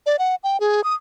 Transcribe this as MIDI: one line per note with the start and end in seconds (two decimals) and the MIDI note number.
0.06 0.16 74
0.19 0.35 78
0.44 0.60 79
0.60 0.84 68
0.84 0.95 87